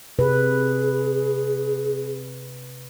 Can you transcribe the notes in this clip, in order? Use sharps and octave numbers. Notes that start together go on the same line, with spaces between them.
C3 G#4 B4